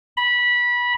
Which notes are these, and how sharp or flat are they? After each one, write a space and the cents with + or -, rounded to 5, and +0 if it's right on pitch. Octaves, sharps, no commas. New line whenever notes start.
B5 -20